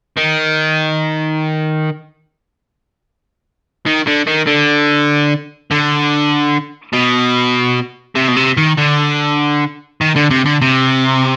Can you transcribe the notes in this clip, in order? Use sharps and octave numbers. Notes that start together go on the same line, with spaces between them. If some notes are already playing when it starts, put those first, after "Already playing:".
D#3
D#3
D3
D#3
D3
D3
B2
C3
B2
C3
D#3
D3
D#3
D3
C3
D3
C3